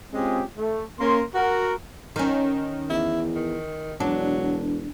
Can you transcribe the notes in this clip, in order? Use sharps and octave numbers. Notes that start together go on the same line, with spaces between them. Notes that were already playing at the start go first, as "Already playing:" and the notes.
G#3 C4 C#4 F4 G4 G#4
A3
A#3 C#4 C6
F#4 A#4
D#3 C#4
E2 E4
D#3
E1 F#3 D4